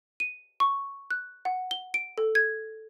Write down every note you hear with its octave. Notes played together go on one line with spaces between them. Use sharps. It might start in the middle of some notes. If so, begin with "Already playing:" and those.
D#7
C#6
F#6
F#5
G7
D7
A4
G#6